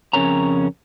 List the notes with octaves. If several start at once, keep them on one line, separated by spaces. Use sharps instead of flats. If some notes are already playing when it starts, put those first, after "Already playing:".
F2 C#3 C#4 A#4 C#5 A#5